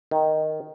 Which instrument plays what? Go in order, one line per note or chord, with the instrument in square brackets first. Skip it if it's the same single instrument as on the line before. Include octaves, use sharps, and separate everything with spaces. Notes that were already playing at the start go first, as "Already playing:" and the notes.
[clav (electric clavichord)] D#3